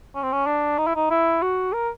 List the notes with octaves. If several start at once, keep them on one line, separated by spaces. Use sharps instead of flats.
C#4
C4
C#4
D4
D#4
E4
D#4
E4
F#4
A#4